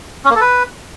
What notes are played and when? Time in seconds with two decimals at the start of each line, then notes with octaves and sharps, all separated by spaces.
0.25 C#4
0.30 A#3
0.36 A4
0.41 B4